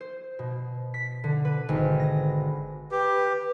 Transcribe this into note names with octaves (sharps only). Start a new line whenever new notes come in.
C5
B2
B6
D3
B4
G#1
A#6
G4 B4